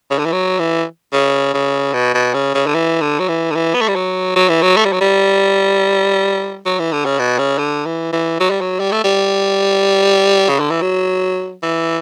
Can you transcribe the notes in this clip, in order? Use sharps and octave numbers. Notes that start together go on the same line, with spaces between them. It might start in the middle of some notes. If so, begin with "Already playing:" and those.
C#3
D3
E3
F#3
E3
C#3
C#3
B2
B2
C#3
C#3
D3
E3
D3
F#3
E3
D3
E3
B3
A3
G3
F#3
F#3
E3
F#3
A3
G3
F#3
G3
F#3
E3
D3
C#3
B2
C#3
D3
E3
E3
F#3
G3
F#3
G3
A3
G3
C#3
D3
E3
F#3
E3